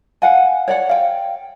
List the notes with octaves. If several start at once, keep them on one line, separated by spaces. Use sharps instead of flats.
F5 F#5 G#5
C#5 D5 F#5
F5 G5